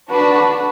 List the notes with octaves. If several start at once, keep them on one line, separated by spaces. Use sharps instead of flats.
D4 F#4 B4